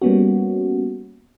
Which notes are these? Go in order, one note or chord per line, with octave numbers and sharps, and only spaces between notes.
G3 A#3 B3 C#4 F#4